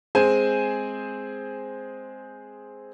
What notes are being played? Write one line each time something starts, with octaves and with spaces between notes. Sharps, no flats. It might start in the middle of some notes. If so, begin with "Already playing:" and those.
G#3 C4 G#4 C5 G#5